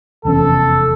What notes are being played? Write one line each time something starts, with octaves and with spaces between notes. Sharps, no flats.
F1 E2 C#4 A4